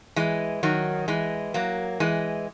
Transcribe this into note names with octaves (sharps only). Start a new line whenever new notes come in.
E3 G#3
D#3 F#3
E3 G#3
F#3 A#3
E3 G#3